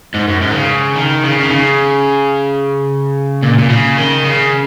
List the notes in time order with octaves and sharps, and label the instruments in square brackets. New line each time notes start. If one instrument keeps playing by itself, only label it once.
[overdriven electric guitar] G#2
F#2
G#2
D#3
C#3
D#3
C#3
D#3
C#3
A#2
A#2
C#3
D#3
C#3